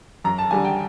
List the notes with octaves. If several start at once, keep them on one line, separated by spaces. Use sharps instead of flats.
F#2 A#5
A5
D3 G3 G#5
G5